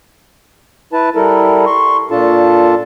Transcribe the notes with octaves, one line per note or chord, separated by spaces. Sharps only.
E4 B4 A5
G3 E4 A4 A#4
C6 C#6
A#2 D4 F4 A4 A5